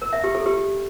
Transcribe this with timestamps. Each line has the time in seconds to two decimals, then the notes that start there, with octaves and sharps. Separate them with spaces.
0.02 A#4
0.13 E5
0.24 G4
0.35 A4
0.46 G4